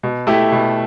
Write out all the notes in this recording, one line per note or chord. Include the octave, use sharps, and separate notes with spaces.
B2
A3 E4 G4
B2